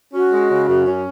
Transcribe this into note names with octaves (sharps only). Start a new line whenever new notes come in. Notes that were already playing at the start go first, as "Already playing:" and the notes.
C#4 F#4
G#3
C#3
F#2
C#4